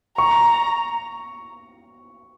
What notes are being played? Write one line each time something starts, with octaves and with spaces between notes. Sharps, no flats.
A#5 C#6